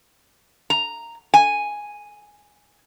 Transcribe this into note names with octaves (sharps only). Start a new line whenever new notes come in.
A#5
G#5